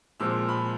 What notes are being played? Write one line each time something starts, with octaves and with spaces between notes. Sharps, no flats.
A#2 F3 G#3 C4 E6
B5